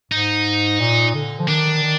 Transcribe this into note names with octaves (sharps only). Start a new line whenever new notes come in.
G#2 D#4
A#2
D3
F3
D#3 D4
D#3